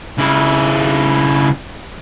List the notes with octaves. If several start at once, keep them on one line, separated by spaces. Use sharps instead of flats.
C#3 E4